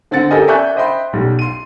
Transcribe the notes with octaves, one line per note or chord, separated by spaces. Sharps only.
D3 C4 F#5 A6 C#7
G4 A4 A#4 D#5 G#5
D5 E5 G#5 C#6 F#6 G6
C5 D#5 E5 G5 B5 C6
B1 G3
C6 D#7